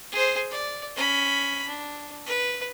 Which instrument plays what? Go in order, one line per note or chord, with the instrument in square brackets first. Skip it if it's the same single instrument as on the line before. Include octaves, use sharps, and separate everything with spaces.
[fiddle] G#4 C5
D5
C#4 B5
D4
B4